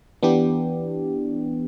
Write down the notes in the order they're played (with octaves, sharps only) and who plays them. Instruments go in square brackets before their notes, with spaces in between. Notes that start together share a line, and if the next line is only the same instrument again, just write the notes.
[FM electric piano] E3 B3 D4 G4